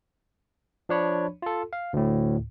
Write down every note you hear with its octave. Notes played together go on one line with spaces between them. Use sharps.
F3 D4 C#5 B5
F4 A4
F5
D2 A2